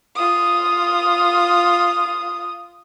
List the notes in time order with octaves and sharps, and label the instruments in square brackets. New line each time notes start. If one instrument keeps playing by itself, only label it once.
[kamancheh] F4 D#6